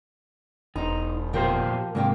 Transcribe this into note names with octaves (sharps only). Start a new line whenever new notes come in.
E1 D#4 C5 A#5
A#2 F3 G4 A#4 C5 G5
G#2 C3 A#4 F5 G5